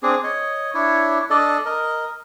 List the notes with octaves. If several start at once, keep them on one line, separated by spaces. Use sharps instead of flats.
C4 D4 G#4
C#5 D#5
D4 E4 C#5
D4 A4 D5 D#5
A#4 D#5